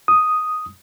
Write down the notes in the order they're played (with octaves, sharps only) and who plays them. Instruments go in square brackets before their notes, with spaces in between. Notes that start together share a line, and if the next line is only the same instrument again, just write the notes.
[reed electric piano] D#6